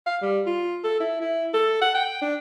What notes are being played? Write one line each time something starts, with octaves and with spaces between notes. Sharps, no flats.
F5
G3
F4
A4
E4
E4
A4
F#5
G5
D4